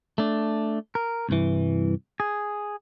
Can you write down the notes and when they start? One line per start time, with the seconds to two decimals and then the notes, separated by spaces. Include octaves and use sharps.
0.18 A3 D4
0.95 A#4
1.29 C2 G2 E3
2.20 G#4